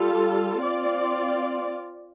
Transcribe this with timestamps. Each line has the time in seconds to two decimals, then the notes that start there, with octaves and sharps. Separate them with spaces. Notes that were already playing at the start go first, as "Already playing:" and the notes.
Already playing: G3 F4 A4
0.62 C4 F4 D5